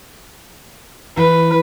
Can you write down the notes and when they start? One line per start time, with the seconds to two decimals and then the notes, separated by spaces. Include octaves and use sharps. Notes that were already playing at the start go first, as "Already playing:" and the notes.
1.17 E3 B4